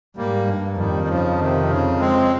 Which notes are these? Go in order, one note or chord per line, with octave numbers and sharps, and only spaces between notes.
G#2 G3 A#3
G2
F2 D#3 G3
G3
C#3 F3
C3 D#3
C#3
G#3 C4